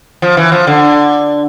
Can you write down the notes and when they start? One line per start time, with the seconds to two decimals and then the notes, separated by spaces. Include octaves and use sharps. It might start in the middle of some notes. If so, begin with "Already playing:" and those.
0.22 F3
0.37 E3
0.52 F3
0.67 D3